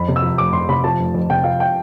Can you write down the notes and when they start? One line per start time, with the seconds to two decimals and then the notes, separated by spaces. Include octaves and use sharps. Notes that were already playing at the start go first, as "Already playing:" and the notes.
Already playing: F2 B5
0.08 C3
0.16 E6
0.22 F3
0.38 F1 D6
0.53 F2 C6
0.69 C3 B5
0.84 F3 A5
0.99 F1
1.14 F2
1.30 C3 G5
1.44 F3 F5
1.60 G5